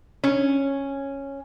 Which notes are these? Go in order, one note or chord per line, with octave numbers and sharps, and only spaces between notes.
C#4